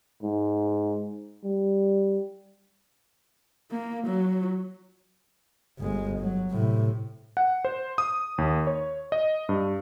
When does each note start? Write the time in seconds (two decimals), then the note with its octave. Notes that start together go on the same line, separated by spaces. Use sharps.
0.23 G#2
1.44 G3
3.71 A#3
4.07 F#3
5.79 G1 G#3
6.19 F#3
6.51 A2 C3
7.37 F#5
7.65 C5
7.98 D#6
8.38 D#2
8.67 C#5
9.12 D#5
9.49 G2